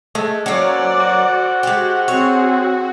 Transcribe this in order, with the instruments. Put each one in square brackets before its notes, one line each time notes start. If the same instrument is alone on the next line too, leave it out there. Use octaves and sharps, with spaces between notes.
[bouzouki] G#3 [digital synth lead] A3
[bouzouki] F#3 A#3 [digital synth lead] C#4 [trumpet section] A4 C5 F#5 [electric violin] D5
[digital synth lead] F#4
[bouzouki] G#3 G4
[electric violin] C4 G#4 [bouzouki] C#5